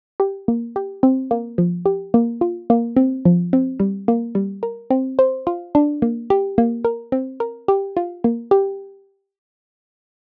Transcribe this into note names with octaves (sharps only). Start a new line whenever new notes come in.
G4
A#3
G4
C4
A#3
F3
G4
A#3
F4
A#3
C4
F3
C4
G3
A#3
G3
A#4
C4
C5
F4
D4
A#3
G4
A#3
A#4
C4
A#4
G4
F4
A#3
G4